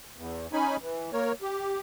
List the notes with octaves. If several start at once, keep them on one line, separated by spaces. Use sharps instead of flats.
E2
C#4 D#4 G#5 B5
E3
A#3 A#4 C#5
G4